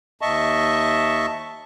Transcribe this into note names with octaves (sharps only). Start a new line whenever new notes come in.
D#2 D#5 E5 A5 C#6